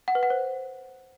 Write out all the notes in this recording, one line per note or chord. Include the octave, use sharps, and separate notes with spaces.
F#5
B4
F#5
C5